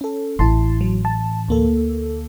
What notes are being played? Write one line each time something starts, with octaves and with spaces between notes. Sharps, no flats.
C#4 A4
A1 E4 A5 C6
F#3
A5
D2 A#3 A4